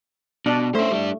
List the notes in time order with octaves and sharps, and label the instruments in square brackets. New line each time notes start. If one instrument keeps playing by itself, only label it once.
[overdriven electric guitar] B2 [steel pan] D4
[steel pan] A3 [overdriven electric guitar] C#4 C5
[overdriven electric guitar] G3 D4